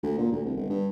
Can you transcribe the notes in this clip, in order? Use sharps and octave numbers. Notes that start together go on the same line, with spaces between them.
D2
A#2
D2
C2
G1
G2